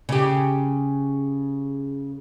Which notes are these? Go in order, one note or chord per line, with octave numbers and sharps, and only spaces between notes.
C#3 G4